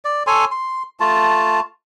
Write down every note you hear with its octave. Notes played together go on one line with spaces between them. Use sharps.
D5
A4 C#5 G#5 C6
C6
A3 F4 A5